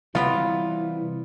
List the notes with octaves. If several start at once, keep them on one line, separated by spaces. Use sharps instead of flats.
C3 E3 F#3 G3 B3 F4